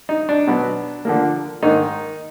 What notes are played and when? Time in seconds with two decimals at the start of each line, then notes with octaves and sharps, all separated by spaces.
0.09 D#4
0.29 D4
0.47 B2 F#3 B3
1.05 D3 F3 A#3
1.62 G#2 D#3 A#3 D#4